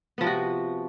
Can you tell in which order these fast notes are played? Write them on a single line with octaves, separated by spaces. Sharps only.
B3 F3 C3 F#4